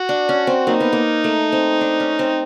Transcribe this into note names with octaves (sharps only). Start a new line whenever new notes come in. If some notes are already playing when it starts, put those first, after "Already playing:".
Already playing: F#4
D4
C#4
C4
F#3 A#3 D#4
B3
A#3
A3
C4
D4
C#4
C4